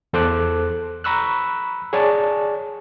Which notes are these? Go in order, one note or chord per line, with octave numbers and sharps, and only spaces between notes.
E2 A4 C5 D6 F#6
A#5 B5 C#6 E6 F#6
G#4 C#5 D5 A5